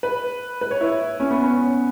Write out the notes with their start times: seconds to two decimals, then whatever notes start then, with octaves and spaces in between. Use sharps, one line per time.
0.03 B4
0.61 B4
0.71 C#5
0.81 E4
1.20 C#4
1.31 B3
1.42 C#4